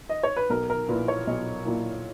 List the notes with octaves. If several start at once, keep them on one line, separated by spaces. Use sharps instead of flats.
D#5
C#5
B4
B1 A#4
A#4
A#2 A#3 E4 B4
C#5
B1 D#5
A#2 A#3 E4